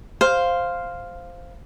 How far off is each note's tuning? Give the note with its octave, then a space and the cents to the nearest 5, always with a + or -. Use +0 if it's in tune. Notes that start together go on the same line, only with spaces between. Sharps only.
C5 +0 F5 +0